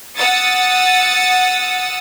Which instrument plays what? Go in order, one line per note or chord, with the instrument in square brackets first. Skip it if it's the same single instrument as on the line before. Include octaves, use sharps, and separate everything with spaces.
[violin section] F#5 D#6 E6 A6 C#7